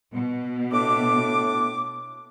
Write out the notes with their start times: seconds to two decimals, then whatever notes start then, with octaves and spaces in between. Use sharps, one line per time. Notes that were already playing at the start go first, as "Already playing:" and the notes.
0.13 B2
0.72 A2 D4 D6